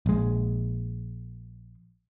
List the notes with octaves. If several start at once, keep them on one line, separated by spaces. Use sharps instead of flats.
A#1 G#3